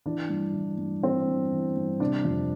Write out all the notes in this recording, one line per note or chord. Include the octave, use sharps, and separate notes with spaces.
E3 D4
G2
E3
G2
E3 C4
G2
E3
G2
C3 D4
F2